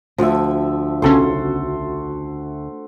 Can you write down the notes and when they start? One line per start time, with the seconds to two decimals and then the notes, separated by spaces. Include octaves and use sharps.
0.18 D2 F3 E5
1.02 B1 C#3 C#4 F#4 A4 C5